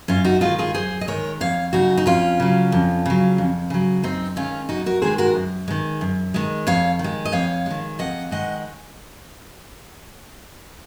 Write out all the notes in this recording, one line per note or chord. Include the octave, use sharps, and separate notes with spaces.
F#2 C#4 F4
D#4 F#4
D#3 G#3 F4 G#4
F4 G#4
F#2 G#4 C5
D#5
D#3 G#3 A#4 C#5
F2 C#5 F5
C#3 F#3 D#4 F#4
D#4
F2 C#4 F4
C#3 F#3
F2
C#3 F#3
F2
C#3 F#3
F#2 C4 D#4
D#3 G#3 C#4 F4
F#2 D#4 F#4
F#4 A#4
D#3 G#3 G#4 C5
F#4 A#4
F#2
D#3 G#3
F#2
D#3 G#3
F2 C#5 F5
D#3
G#3
D#5
F2 C#5 F5
D#3 G#3
F2 D#5 F#5
D#3 G#3 D#5 F#5